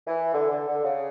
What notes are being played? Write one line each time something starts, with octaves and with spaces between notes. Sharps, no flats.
E3
D3
D3
D3
C#3